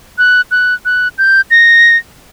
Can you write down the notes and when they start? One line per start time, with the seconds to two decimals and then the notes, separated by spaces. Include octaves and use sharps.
0.18 F#6
0.51 F#6
0.85 F#6
1.18 G6
1.51 A#6